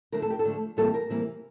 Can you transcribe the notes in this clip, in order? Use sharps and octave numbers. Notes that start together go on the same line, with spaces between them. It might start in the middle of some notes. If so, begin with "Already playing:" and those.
D3 F3 A3 A#4
A4
G4
A4
D3 F3 A3
C3 E3 G3 A#3 A4
A#4
C3 E3 G3 A#3